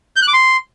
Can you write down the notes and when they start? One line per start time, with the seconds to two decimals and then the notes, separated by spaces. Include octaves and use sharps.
0.16 G6
0.22 F#6
0.28 D6
0.33 C6